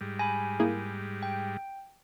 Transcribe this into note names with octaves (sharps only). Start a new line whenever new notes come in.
G#2 G3
G#5 B5 A#6
A#3 E4 G#4
G5